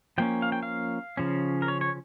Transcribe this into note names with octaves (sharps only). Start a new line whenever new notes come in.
F3 A#3 C#4 G5
F5
G5
F5
C#3 F3 C#4
A#4
C#5
C#5